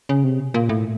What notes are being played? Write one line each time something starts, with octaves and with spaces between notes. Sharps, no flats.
C#3
C3
A#2
A2